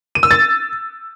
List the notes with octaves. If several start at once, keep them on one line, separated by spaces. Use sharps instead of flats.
D#7
E6
A6